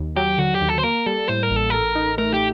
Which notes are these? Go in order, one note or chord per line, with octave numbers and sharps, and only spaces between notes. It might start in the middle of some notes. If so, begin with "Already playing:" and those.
Already playing: D#2
F#3 G4
D3 F#4
G4
D#2
A4
C5
A#3 A#4
G3 A4
A2 C5
A#4
A1
A4
A4 A#4
D#4
A3 A#4
G4